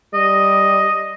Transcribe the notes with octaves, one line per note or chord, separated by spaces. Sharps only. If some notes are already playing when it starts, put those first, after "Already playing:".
G3 D#5